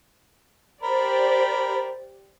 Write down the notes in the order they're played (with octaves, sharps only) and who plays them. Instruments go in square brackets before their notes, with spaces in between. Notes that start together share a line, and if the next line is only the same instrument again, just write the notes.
[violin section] G4 C5 D5 [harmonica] A#4 B5